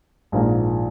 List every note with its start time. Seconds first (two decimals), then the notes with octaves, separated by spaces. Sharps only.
0.32 A#1 G#2 F3 A#3